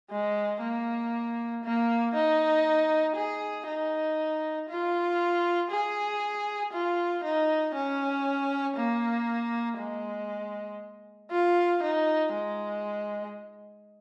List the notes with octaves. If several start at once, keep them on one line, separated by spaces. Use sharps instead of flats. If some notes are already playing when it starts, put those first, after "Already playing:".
G#3
A#3
A#3
D#4
G#4
D#4
F4
G#4
F4
D#4
C#4
A#3
G#3
F4
D#4
G#3